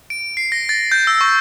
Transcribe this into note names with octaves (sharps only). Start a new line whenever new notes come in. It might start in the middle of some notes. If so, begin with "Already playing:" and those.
D7
C7
A#6
A6
G6
E6
C#6